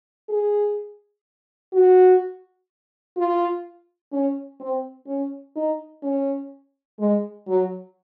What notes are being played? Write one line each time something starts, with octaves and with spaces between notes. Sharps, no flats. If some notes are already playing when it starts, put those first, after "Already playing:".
G#4
F#4
F4
C#4
C4
C#4
D#4
C#4
G#3
F#3